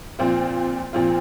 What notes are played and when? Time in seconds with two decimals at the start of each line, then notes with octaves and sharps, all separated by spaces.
0.19 A#2 F3 C4 F4
0.93 A#2 F3 C4 F4